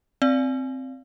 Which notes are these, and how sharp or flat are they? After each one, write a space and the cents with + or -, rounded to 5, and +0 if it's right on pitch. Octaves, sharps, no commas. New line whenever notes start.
C4 +0 D5 -10 F5 +0